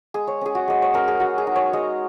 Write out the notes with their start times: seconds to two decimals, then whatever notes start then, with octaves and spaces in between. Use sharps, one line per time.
0.14 G#3 G#4
0.27 C#5
0.41 C#4 G#4
0.55 F#4
0.68 G#3 D#5
0.82 C#5
0.94 C#4 A#4
1.08 G#4
1.20 G#3 F#4
1.38 G#4
1.47 D#4
1.56 C#5
1.73 G#3 D#5